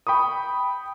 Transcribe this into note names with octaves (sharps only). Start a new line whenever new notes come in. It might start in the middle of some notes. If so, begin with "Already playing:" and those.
G5 B5 C#6 D#6